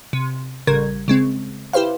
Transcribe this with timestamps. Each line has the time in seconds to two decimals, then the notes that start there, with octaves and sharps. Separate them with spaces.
0.13 C3
0.67 A1 C#3 G3 A#4 G#6
1.08 C#3 G#3 C4
1.73 E4 G4 B4 C5 F5